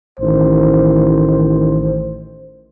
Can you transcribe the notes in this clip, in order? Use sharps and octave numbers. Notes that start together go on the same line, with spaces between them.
A1 D#3 C5